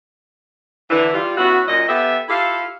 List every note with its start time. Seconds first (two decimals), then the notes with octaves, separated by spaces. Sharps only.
0.90 D3 E3
1.14 G3 F4
1.37 B3 C#4 E4 F#4
1.68 F#2 A#2 D#5
1.88 B3 G4 A4 E5
2.29 E4 F4 G4 A4 F5